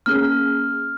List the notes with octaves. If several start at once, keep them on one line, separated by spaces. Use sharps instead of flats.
A#3 C#4 G#4 F6